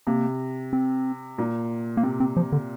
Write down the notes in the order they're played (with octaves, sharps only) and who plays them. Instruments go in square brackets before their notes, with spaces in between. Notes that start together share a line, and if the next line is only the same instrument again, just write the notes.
[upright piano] C3 [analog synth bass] A#3
[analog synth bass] C4
[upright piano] A#2
[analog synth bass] A#3
[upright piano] C3 [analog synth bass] C4
[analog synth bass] C4
F3
D3